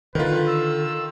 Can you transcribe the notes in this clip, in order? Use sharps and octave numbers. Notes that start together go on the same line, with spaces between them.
D3 D#3 F4 B4
E6